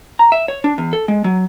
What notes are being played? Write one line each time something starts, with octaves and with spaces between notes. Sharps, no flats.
A#5
E5
C#5
D4
E2
A4
G#3
F#3